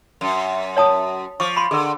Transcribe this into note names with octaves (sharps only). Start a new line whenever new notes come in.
F#2
C#5 A5 D#6
F3 C#6 D6
B5 C6
D3 G#4 A#4